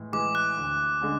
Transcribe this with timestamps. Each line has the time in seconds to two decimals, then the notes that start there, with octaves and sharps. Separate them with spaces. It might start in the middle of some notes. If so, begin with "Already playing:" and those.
Already playing: A2 E3 G#3
0.13 E3 G#3 D6
0.35 F#6
0.57 D2
1.01 D3 G#3 C#4